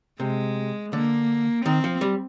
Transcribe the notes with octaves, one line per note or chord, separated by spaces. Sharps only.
C3 G#3
D3 A#3
D#3 C4
F3
G3